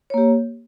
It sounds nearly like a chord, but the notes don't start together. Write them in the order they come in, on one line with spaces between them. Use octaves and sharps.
C#5 A#3 G4